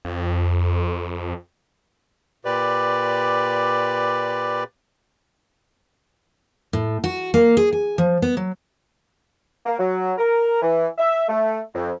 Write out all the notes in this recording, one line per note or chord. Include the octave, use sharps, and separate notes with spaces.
F2
A#2 G4 B4 D5
A2
F#4
A#3
G#4
G#5
F3
B3
F#3
A#3
F#3
A#4
E3
E5
A3
F2